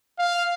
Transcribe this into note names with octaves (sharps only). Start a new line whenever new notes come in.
F5